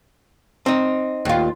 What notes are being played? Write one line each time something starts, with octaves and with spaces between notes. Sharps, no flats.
C4 D#4
D#2 F4